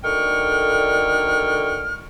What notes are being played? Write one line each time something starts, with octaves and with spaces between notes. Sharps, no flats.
D2 D3 D#3 G5 C#6 F6